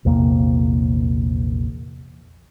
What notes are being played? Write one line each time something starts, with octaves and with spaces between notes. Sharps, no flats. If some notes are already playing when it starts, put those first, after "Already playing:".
A#1 E2 C3 A#3